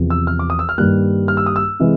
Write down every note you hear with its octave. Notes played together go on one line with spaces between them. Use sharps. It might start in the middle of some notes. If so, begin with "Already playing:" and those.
Already playing: E2 C3 F3
E6
F6
D6
D#6
E6
F6
G2 D#3 G3 A#3 F#6
F6
E6
D#6
E6
C3 E3 G#3